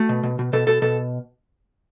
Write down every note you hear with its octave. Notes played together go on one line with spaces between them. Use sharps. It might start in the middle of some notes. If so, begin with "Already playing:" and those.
Already playing: A3 F#4
B2
B2
B2
B2 A4
B2 A4
B2 A4